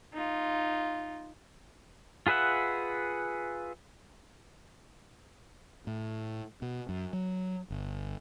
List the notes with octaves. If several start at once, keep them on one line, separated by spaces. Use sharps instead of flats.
D#4 F4
F4 G#4 B4 E5 F#5
A2
B2
F#2
F#3
G1